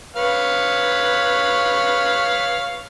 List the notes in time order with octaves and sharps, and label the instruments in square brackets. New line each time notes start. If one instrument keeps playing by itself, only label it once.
[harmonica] B4 C#5 F5